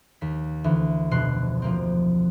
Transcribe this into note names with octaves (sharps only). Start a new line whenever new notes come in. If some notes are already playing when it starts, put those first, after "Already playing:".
D#2 B6
D2 E3
F1 B2 C6 F#6 C7
F3 A#3 C4